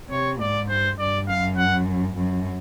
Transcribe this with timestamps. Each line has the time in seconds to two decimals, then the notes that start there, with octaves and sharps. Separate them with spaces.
0.10 C3 C#5
0.40 G#2 D5
0.69 G2 C5
0.98 G2 D5
1.27 F#2 F5
1.57 F#5
2.16 F#2